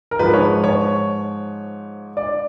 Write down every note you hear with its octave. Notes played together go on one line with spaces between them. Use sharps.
A#4
G#2 F3 B4
C#5
C#5
D5